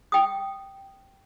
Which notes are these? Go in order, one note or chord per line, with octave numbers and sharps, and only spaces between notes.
G5 D#6